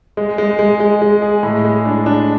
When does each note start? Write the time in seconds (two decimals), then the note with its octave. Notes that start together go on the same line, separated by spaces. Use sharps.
0.17 G#3
0.38 G#3
0.59 G#3
0.80 G#3
1.02 G#3
1.22 G#4
1.43 A2
1.65 G#3
1.85 D4
2.06 D4